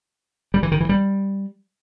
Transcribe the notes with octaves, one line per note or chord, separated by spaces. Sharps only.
G3
E3
D#3
E3
G3